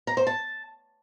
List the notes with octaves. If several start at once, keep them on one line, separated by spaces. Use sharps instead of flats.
A#5
C5
A5